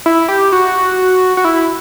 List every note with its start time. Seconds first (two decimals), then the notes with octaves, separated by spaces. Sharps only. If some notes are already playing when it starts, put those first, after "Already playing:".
0.06 E4
0.28 G4
0.52 F#4
1.37 F#4
1.45 E4